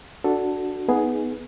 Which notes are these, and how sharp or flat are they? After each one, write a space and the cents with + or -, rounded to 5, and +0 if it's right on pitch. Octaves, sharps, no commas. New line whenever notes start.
D4 +0 F#4 +0 A4 +0
B3 +0 D#4 +15 G#4 +5